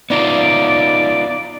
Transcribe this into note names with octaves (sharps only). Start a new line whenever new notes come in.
B3 D#4 F4 D5